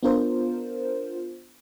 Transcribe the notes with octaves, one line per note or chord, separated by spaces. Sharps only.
B3 D4 F4 A#4 C5